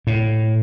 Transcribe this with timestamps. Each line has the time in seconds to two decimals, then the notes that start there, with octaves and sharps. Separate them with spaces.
0.07 A2